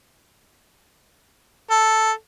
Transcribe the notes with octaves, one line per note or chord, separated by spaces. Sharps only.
A4